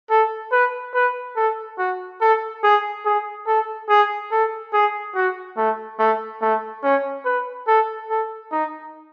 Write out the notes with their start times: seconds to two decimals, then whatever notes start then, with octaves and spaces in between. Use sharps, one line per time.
0.10 A4
0.52 B4
0.94 B4
1.36 A4
1.79 F#4
2.21 A4
2.63 G#4
3.05 G#4
3.47 A4
3.89 G#4
4.31 A4
4.73 G#4
5.15 F#4
5.57 A3
5.99 A3
6.42 A3
6.83 C#4
7.25 B4
7.68 A4
8.10 A4
8.52 D#4